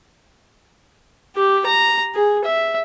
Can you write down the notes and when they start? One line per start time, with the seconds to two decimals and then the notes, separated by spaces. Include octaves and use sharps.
1.36 G4
1.66 A#5
2.15 G#4
2.45 E5